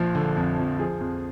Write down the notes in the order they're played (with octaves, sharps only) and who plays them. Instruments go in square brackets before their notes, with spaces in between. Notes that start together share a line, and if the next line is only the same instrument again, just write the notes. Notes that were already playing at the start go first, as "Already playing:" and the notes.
Already playing: [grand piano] A#1 F3
D3
F2
F2
F3 G#4
F2